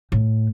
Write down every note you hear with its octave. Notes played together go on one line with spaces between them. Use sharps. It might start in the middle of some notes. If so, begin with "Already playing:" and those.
A2